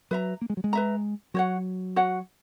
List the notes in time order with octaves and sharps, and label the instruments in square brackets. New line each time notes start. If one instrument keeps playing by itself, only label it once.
[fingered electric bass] F#3 [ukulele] B4 E5 A#5
[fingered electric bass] A#3
G#3
F#3
G#3
[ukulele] B4 E5 A#5
[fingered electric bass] F#3 [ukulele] F#4 C#5 F#5
[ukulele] F#4 C#5 F#5